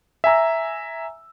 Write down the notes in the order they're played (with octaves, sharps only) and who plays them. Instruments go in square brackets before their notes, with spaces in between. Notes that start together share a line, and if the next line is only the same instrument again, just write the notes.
[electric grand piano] E5 G#5 A#5 E6